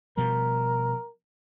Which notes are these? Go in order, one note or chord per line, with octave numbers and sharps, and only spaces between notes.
B2 F3 G3 A#4